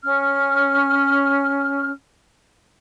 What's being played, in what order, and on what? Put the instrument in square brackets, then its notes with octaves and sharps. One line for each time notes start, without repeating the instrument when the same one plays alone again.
[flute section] C#4 F6